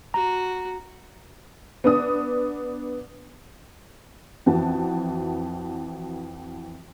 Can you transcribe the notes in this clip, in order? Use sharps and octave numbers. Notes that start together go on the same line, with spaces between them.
F#4 A#5
B3 D4 D#6
F2 E3 F#4 A5